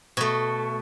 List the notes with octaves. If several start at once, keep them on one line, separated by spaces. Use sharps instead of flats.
B2 A3